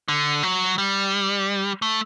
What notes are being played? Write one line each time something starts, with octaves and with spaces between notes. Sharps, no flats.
D3
F#3
G3
A3